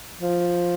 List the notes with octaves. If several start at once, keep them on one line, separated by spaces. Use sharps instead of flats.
F3